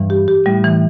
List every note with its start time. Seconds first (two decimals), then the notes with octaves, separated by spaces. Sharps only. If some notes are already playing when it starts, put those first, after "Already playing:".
Already playing: G2 E3
0.10 G4
0.28 G4
0.46 A2 G3
0.64 E3